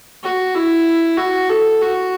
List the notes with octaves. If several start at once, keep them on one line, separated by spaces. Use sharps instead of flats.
F#4
E4
F#4
A4
F#4